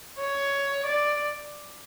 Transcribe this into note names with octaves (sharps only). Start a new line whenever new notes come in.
C#5
D5